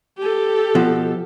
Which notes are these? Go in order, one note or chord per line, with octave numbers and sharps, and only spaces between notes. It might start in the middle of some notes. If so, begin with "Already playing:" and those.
G4 A4
B2 F3